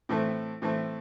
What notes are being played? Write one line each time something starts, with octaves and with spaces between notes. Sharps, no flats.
A2 E3 A3 C4
A2 E3 A3 C4